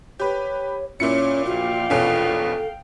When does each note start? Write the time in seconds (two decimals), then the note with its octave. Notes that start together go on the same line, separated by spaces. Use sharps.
0.20 G4 B4 C#5
1.00 A#2 C#4 E4 F4 C#5 C#7
1.45 A#1 F4 F#4 F5 G5
1.90 E2 B2 C#4 A4